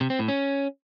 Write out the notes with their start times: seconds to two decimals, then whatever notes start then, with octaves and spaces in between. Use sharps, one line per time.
0.01 C3
0.10 C4
0.19 A2
0.28 C#4